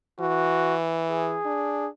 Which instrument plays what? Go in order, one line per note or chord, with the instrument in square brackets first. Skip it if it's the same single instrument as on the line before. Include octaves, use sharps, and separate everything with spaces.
[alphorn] E3 [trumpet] F#4
[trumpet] G#4
[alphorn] D4